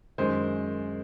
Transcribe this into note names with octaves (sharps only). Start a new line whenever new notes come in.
F#2 D#3 G#3 C5